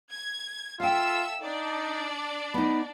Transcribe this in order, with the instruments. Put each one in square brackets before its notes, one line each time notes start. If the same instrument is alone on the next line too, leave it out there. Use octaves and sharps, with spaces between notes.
[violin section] G#6
[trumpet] F4 [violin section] A4 E5 E6 [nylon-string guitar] F5 G5
[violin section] D4 D5 [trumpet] D#4
[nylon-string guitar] B3 D#4 [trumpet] B5